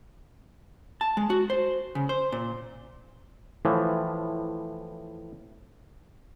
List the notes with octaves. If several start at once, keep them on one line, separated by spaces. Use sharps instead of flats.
A5
G#3
F#4
C5
C#3
C5
A#2
A2 E3 F3